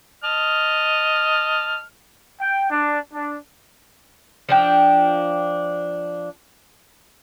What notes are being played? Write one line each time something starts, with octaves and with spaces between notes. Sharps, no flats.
D#5 A5 F6
G5
D4
D4
F3 D4 G5